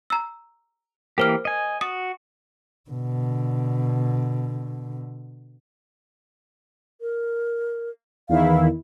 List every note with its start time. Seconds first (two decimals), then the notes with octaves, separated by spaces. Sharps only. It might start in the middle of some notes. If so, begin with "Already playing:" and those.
0.10 A#5 E6
1.18 E3 A#3 G4 A#4 C5 F6
1.45 D#5 G#5
1.81 F#4 D#6
2.90 B2 D3
7.01 A#4
8.29 E2 D#3 E4 F5